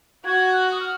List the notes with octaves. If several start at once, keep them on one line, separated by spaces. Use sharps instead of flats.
F#4 G#6
F#6
D#6
F6